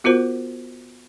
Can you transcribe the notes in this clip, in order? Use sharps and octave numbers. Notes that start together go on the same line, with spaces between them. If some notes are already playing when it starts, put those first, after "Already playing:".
B3 F4 F#4 A#4 C5